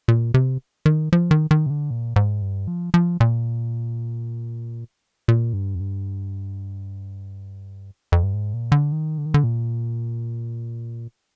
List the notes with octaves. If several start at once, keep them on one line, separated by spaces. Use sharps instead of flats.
A#2
C3
D#3
F3
D#3
D#3
C3
D3
A#2
G#2
G2
F3
F3
A#2
A#2
G2
F2
G2
F2
G2
G#2
A#2
D3
D#3
D3
D#3
D3
A#2